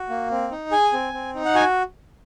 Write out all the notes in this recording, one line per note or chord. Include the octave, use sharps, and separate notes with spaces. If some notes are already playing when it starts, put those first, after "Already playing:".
Already playing: F#4
A#3
C4
D#4
G#4 G#5
C4
C4
D#4
F#5
F#4 G#5